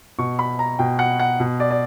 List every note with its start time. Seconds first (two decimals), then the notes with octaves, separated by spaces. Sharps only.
0.19 B2 C#6
0.39 B5
0.59 A#5
0.79 B2 G5
0.99 F#5
1.20 F#5
1.40 B2
1.60 D5
1.71 D5